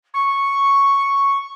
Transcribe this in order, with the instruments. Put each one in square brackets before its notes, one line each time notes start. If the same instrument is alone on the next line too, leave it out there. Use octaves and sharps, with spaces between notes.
[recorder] C#6